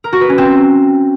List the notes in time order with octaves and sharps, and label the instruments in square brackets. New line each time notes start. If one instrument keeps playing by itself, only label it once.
[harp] A#4
F#4
B4
C#4
C4